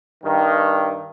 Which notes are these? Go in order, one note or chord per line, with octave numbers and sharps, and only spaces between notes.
G2 D#3